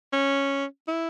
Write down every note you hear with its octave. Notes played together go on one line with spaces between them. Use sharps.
C#4
E4